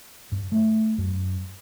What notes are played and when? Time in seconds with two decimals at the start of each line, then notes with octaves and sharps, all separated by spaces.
0.32 G2
0.52 A3
0.98 F#2